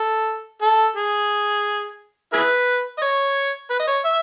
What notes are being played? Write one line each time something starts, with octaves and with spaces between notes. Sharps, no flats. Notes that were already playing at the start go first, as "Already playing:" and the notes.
Already playing: A4
A4
G#4
E4 G#4 B4
D#5
C#5
B4
D#5
C#5
E5